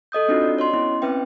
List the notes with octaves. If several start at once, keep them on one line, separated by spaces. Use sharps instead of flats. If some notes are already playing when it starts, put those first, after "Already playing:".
A4 D#5 D#6 G6
C4 D4 D#4 F4 F#4
D5
C#5 D#5 C6
B3 C#4 E4
C4 C#4 B4 E5 G5